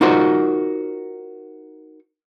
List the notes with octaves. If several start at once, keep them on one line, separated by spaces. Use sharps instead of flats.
D#4 F4 F#4 A#4 C5